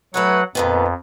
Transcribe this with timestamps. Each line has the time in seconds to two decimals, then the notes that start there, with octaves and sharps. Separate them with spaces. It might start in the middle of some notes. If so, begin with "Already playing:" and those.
0.14 F#3 A3 B4 C#5 F#5
0.55 F2 A#2 D#3 B3